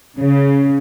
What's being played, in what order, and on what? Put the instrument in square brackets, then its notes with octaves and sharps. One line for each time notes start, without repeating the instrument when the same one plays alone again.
[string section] C#3